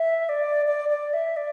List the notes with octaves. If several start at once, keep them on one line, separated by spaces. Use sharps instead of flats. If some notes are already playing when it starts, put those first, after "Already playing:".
Already playing: E5
D5
D5
D5
E5
D5